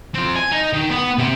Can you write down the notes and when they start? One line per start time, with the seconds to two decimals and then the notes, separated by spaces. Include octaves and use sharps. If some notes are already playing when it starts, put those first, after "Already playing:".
0.14 C4 F4
0.36 G#5
0.51 D#4
0.73 D#3
0.90 B3
1.18 C3 G4